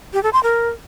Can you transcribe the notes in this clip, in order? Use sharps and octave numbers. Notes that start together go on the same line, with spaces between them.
G4
A4
C6
A#4